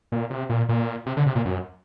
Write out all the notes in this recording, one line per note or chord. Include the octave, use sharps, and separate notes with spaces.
A#2
C3
A#2
A#2
C3
D3
C3
A#2
F#2